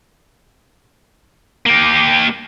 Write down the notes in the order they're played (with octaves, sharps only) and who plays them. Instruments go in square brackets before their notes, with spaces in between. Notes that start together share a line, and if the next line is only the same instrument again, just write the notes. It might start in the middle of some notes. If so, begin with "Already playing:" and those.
[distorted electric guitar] A#3 G4